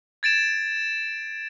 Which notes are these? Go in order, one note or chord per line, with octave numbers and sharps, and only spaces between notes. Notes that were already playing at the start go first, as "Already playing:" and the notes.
G#6 A6 D7 E7